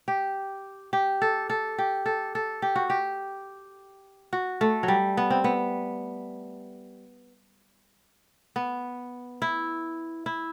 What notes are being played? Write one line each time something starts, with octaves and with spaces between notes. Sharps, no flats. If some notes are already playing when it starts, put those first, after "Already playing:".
G4
G4
A4
A4
G4
A4
A4
G4
F#4
G4
F#4
A3
F#3
G3
B3
C4
B3
B3
E4
E4